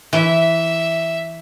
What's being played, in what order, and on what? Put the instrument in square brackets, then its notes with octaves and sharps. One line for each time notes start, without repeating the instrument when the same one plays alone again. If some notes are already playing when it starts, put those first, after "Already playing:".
[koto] E3 [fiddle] E5